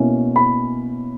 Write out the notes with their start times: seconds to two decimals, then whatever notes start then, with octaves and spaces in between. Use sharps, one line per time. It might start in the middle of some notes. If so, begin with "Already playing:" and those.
Already playing: B2 A#3 C#4 E4
0.36 B5